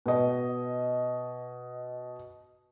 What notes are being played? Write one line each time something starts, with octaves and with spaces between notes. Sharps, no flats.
B2 D#5